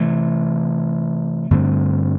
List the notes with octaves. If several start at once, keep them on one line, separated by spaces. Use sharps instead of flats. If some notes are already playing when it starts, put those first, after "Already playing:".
Already playing: C3 E3 A3
G2 D3 A3 C4